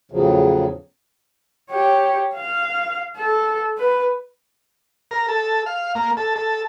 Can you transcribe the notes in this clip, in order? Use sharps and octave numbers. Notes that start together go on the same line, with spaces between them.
E2 A2 C#3 F3 F#3
G4 C#5
F5
A4
B4
A#4
A4
F5
A#3
A4
A4